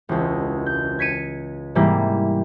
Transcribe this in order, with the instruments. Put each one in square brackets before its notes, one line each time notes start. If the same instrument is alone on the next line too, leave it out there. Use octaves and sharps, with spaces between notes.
[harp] E1 C#2
G6
G#6 B6 C#7 D#7
G#2 C3 E3 G3 A#3